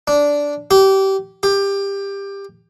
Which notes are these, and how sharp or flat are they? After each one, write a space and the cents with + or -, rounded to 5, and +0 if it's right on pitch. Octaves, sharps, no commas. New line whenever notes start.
D4 -10
G4 -25
G4 +15